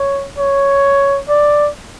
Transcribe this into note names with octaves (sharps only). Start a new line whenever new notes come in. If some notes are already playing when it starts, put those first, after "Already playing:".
Already playing: C#5
C#5
D5